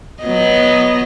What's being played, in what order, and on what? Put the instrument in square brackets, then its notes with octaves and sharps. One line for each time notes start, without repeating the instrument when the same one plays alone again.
[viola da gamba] F#3 B3 D#5